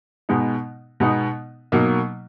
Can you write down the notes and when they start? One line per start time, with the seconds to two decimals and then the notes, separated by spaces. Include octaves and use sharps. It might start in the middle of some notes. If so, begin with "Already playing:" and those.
0.29 B2 G#3 B3 D#4
1.00 B2 G#3 B3 D#4
1.72 B2 F#3 A#3 D#4